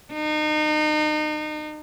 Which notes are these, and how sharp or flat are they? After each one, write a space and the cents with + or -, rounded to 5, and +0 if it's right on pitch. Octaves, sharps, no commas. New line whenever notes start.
D#4 -35